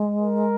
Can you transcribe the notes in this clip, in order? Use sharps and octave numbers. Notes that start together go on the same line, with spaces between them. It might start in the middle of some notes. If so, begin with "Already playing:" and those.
Already playing: G#3
A#4